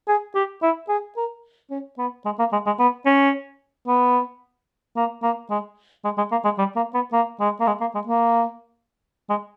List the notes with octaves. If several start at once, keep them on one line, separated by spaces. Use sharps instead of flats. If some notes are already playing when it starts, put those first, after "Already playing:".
G#4
G4
E4
G#4
A#4
C#4
B3
G#3
A#3
G#3
G#3
B3
C#4
B3
A#3
A#3
G#3
G#3
G#3
A#3
G#3
G3
A#3
B3
A#3
G#3
A#3
G#3
A#3
G#3
A#3
G#3